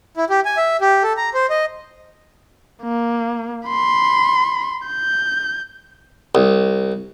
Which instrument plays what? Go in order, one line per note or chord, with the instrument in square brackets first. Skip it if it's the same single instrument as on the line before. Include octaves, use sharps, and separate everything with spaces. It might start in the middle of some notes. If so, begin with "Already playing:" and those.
[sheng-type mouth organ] E4
G4
G#5
E5
G4
A4
A#5
C5
D#5
[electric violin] A#3
B5 C6
G6
[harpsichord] C2